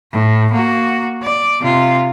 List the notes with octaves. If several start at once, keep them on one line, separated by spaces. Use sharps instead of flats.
A2
A#3 F#4
D5
C3 F4